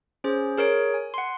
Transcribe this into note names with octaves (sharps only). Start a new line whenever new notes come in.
C#4 G#4 C5
G#4 A#4 C#5 D7
G#5
F#5 C6